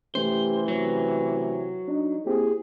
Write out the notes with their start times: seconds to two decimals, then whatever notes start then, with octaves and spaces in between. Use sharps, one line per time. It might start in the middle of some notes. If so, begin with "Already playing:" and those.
0.15 C2 E3 A3 C#4 G4 C5
0.68 C3 F#3
1.88 D4 D#4
2.26 A#3 C4 E4 G4 G#4